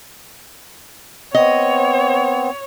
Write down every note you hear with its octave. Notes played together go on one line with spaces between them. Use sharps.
B3 C4 C#5 D#5